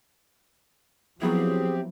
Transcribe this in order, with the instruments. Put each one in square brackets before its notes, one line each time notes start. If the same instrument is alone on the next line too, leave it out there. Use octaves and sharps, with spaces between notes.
[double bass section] F3 [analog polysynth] F#3 B3 E4 [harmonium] C4 G4 [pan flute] G#4